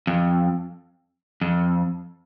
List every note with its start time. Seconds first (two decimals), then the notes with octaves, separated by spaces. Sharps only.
0.07 F2
1.41 F2